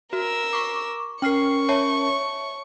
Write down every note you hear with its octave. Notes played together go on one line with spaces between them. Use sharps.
F#4 A#4 E6
C#6 D6
C#4 A#4 G5 C#6 F6 C7
C#5 E5 A5